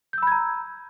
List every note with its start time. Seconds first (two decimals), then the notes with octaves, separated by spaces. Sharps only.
0.13 G6
0.18 E6
0.23 B5
0.27 G#6
0.32 A#5